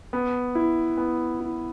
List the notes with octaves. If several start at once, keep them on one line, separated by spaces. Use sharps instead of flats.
B3
E4
B3
E4